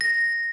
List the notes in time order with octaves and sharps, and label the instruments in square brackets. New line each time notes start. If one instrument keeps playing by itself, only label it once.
[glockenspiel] A#6